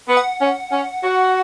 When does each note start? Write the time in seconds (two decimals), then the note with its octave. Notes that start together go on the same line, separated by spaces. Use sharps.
0.09 B3
0.17 F#5
0.40 C#4
0.72 C#4
1.04 F#4